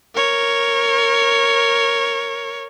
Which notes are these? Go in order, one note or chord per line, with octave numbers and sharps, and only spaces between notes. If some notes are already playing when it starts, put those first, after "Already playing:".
A#4 C#5